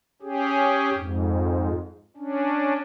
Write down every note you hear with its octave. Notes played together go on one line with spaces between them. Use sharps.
C#4 G4 G#4
F2 G#2
C#4 D4